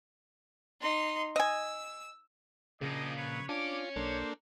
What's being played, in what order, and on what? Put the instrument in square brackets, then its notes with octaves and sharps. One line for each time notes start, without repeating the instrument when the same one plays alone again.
[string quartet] D#4 C6
[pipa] D#5 G#5 [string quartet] E6
[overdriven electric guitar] A#2 F3 [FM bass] C#3 [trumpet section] G4 G#4 D#5
[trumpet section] B4 C#5
[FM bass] D4 [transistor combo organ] F4 [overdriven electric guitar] C#5 G#5 [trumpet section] D6
[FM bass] B1 [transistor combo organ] A#3 D4 A4 [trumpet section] C5